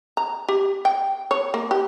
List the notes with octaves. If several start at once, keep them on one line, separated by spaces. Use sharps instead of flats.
A#5
G4
G5
C#5
A#3
G4